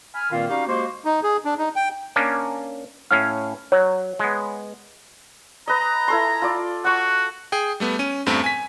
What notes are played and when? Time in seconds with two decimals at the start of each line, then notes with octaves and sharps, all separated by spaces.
0.14 G#5 B5 F6
0.31 G2 A#2 D#3 A#3 C4 F4
0.49 G3 C#4 D#4 F#4 G4 F5
0.67 F3 G#3 A#3 F#4 G4 C5
1.05 D#4
1.23 G#4
1.45 D4
1.58 D#4
1.76 G5
2.16 A#3 C#4 D4
3.11 A2 C#4 F5 F6
3.72 F#3 C#5
4.19 G#3 B3
5.68 B4 D#5 A#5
6.08 E4 A4 C6
6.42 F4 D5
6.84 F#4 F#5 C#6
7.52 G#4 G5
7.80 G3 A3 B3
7.99 C#4 D#7
8.26 E2 G2 A3 C4
8.44 G#5 B6